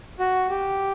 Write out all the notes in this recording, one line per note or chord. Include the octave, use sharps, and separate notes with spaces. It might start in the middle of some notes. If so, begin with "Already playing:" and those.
F#4
G4